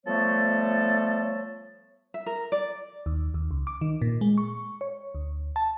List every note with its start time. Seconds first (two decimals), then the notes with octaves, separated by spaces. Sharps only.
0.07 F3 G3 A3 B3 A4 C#5
2.14 E5
2.26 A#4
2.52 D5
3.06 D#2
3.34 D#2
3.51 C#2
3.67 D6
3.81 D#3
4.02 A#2
4.21 G#3
4.38 C#6
4.81 C#5
5.15 D2
5.56 A5